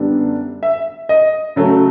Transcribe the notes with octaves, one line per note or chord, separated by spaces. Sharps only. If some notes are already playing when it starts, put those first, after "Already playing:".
Already playing: F#2 D3 G3 B3 D4
E5
D#5
C#3 F#3 A3